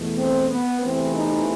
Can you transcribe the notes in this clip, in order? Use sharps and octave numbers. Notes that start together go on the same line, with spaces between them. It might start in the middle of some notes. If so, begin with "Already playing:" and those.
Already playing: E2 B2 A3
C4
B3
E2 C3 E3 A3 C4
D#4